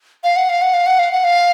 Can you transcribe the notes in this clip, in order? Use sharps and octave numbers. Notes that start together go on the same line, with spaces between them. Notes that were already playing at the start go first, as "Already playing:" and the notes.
F5
F#5
F5
F#5
F5
F#5
F5
F#5
F5